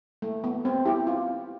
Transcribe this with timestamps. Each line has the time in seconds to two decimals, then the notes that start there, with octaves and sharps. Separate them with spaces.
0.22 A3
0.44 B3
0.65 C4
0.85 E4 G4
1.07 F4